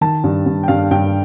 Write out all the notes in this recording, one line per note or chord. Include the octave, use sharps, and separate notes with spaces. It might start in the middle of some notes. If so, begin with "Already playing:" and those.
D#3 A5
G2
G2
G5
G2 F5
G2 G5